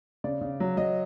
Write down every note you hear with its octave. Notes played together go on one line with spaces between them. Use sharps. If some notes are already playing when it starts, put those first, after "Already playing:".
C#3 D5
C#3
F#3
F#3 D#5